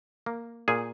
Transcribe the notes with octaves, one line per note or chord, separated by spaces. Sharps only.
A#3
A#2 G#4